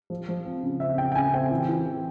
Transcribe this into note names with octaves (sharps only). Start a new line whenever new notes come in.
F3
F3
C4
C#3
C4 E5
C#3 G5
G5
C#3 G#5
C4 G5
E3
E3
E3